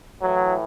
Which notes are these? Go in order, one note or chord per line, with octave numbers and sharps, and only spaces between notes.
A2 E3 F#3